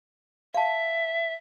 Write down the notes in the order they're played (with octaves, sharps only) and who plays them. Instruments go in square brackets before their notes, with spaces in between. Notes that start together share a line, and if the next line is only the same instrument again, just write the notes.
[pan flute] E5 [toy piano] F5 A5